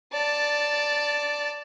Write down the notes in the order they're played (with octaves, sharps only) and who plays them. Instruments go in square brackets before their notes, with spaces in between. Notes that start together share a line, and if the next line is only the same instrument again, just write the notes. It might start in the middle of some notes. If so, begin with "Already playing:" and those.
[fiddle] D5 A5